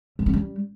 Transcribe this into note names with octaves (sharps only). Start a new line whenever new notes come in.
G3
C#4
G3